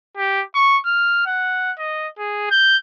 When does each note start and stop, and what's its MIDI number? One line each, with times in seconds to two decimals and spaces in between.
0.17 0.42 67
0.55 0.78 85
0.85 1.22 89
1.26 1.72 78
1.79 2.08 75
2.18 2.48 68
2.51 2.77 91